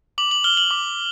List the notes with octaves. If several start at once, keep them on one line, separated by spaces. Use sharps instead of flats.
D6 F#7
F#7
F6 G7
F#7
D6